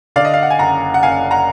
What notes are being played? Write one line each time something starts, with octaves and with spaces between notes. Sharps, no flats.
D3 D5 F5
D#5
F5
F#5
G#5
F#1 F#5 A#5
F#5
F#1 F5 G#5
F#5 A#5